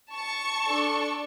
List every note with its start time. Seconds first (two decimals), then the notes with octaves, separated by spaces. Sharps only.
0.14 A5 C#6
0.65 D4 A4